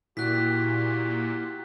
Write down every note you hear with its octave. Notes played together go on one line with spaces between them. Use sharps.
A#2 E4 F#4 G4 F#6 B6